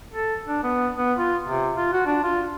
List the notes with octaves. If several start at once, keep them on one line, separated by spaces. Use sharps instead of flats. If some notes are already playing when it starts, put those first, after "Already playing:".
A4
D4
B3
B3
F4
C3
F4
F#4
D4
F4